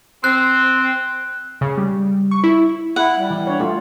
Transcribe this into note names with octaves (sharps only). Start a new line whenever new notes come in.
C4 F#6
C#3
G3
C#6
E4
E4 F#5
G3
E3
D4 C#5
A3 F4